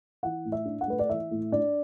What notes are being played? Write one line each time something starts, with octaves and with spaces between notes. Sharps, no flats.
E3 F#5
A2
E5
D4
F#5
A3 B4
D5
E3 E5
A2
D4 D5